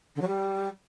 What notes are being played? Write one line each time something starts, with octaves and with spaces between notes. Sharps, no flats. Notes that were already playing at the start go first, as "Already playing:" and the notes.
D3
F#3
G3